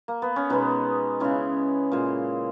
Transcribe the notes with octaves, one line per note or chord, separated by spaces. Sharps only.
A#3
B3
C#4
B2 G#3 B3 D#4
C#3 G#3 C#4 E4
A#2 G#3